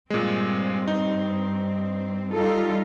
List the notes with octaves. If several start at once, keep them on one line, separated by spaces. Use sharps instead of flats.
G2 A#2 G#3 C4
D#4
G3 D#4 F4 A4